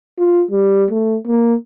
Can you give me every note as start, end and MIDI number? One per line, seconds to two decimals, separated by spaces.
0.19 0.44 65
0.51 0.85 55
0.90 1.17 57
1.27 1.55 58